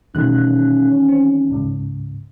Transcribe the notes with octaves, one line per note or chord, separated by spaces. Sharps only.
E2 B2 D#3 G3 A3 C#4 F#6
C4
C#2 G#2 C#3